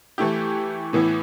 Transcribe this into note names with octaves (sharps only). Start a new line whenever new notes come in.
E3 A3 E4 G4
A2 E3 B3 E4